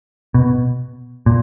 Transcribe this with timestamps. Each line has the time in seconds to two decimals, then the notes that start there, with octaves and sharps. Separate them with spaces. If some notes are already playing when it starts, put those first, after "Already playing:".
0.34 B2
1.26 A#2